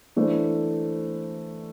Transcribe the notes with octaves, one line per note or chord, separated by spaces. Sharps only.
E3 A3 D4 A4 C5